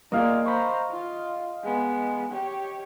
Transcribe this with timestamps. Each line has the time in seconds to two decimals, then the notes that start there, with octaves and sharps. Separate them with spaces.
0.12 A#3 F4 G#4 D5 D#5 F5
0.45 C5 A#5 B5 C#6
0.90 F4
1.63 G#3 B3
2.31 G4 C#5